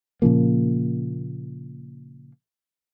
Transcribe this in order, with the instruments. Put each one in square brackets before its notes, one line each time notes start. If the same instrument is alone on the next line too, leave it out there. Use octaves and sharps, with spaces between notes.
[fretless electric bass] A#2 C#3 F3 A#3